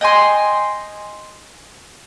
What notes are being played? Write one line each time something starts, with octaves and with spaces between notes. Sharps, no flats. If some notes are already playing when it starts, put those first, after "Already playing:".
D#5 G5 G#5 C6